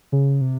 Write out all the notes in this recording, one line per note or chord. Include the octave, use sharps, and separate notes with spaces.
C#3
C3